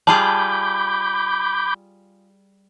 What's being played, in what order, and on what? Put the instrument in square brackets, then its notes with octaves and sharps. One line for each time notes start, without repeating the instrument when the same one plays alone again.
[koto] G3 F4 G#4 [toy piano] A5 [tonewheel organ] B5 D6 G6